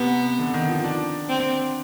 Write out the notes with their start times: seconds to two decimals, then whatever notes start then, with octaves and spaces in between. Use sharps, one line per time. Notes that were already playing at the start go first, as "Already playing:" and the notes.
Already playing: C3 B3
0.39 D3
0.54 D#3
0.69 F3
0.84 D4
1.29 C4